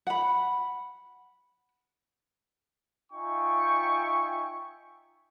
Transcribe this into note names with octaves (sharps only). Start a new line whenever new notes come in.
F#5 B5
D#4 F4 E5 G5 G#5 C#6